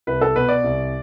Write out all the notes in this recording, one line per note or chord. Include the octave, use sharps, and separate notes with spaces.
C2 B4
A4
B2 B4
D5
C2